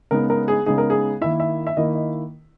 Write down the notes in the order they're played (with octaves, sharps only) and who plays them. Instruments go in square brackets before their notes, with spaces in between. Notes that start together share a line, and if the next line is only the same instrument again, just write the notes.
[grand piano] C#3 G#3 B3 D#4 [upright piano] A#4
[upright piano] A#4
G#4
[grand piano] C#3 G#3 B3 D#4 [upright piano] G#4
[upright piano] A#4
G#4
[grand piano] D#3 A#3 E4 [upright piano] E5
[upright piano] E5
E5
[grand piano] D#3 A#3 E4 [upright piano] D#5
[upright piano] D#5